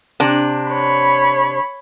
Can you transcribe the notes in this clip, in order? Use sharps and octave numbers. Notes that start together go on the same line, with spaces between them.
C3 D4
C#5 B5